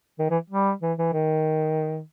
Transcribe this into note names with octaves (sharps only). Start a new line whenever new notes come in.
D#3
E3
G3
E3
E3
D#3